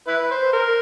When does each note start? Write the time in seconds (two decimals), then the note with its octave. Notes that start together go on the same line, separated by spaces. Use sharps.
0.08 E4 B4
0.31 C5
0.53 A#4